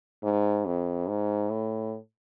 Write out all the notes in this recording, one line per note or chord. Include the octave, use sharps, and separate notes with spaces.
G#2
F2
G#2
A2